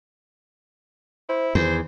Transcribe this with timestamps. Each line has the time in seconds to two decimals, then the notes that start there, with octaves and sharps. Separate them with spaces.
1.29 E4 C5
1.55 E2 D#3 C5